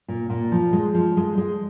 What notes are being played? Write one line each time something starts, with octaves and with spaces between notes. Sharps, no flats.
A#2
A#2
F3
G#3
F3
G#3
G#3